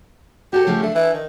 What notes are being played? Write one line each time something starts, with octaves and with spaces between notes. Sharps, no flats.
F#4 G4 A4
C#3 F3 A3
A3 D4
E3
D#3